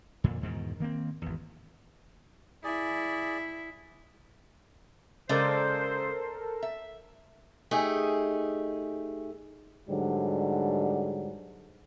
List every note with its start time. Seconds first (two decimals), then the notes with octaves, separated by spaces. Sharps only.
0.24 F2 A#2 D3
0.41 E2 G#2 B2 D#3
0.80 D#3 A#3 C4
1.22 G#1 E2
2.64 E4 G#4 D5
5.29 C#3 G#3 A4 A#4 C5 D5
6.63 E5
7.71 A3 D#4 G4 G#4
9.89 G#2 D3 F#3 G3